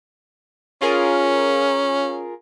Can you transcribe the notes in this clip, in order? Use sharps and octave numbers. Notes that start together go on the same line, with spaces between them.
C#4 F4 G#4 A#4